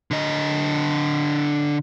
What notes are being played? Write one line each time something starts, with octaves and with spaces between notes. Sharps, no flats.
D3 D#5